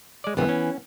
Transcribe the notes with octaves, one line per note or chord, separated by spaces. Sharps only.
G#3 D5
G#1 C#2 F#2 E3 B3
C#4